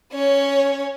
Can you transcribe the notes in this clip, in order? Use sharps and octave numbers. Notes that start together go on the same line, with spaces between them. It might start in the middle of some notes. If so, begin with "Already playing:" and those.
C#4 C#5